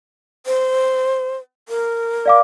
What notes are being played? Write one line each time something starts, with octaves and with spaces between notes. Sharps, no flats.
C5
A#4
D5 F5 D6